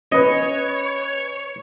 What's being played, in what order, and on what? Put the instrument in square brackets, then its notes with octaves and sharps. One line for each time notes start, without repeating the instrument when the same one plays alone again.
[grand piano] C#4 B4 [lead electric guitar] C#5 [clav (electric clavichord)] D#5